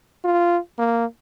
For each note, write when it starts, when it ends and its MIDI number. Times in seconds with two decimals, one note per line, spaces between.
0.25 0.58 65
0.79 1.05 58